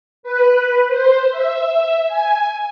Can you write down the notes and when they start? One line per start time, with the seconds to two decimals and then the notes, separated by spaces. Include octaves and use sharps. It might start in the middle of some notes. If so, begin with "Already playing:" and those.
0.23 B4
0.88 C5
1.31 E5
2.08 G#5